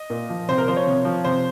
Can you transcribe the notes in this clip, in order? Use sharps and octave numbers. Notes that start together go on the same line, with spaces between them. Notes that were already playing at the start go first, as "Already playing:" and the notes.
Already playing: D#5
A#2
F3
C3 C5
A#4
F3 C5
C#5
C3
F3
C3 C5